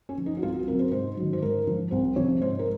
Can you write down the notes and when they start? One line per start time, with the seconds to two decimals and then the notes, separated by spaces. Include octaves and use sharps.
0.09 C#4
0.18 F3
0.26 D#4
0.37 F#4
0.43 C2 F4
0.54 F#4
0.67 C3 A#4
0.72 F#3
0.79 C5
0.91 G#2 C5
1.17 D#3 F#3
1.33 C5
1.42 G#2 A#4
1.67 F3
1.91 C2 C5
2.16 C3 F3 C#5
2.41 G#2 C5
2.59 A#4